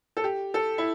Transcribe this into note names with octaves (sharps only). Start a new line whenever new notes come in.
A4
G4
A4
E4